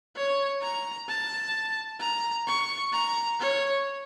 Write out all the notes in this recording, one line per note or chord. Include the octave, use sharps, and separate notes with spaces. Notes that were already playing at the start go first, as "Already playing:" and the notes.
C#5
A#5
A5
A#5
C#6
A#5
C#5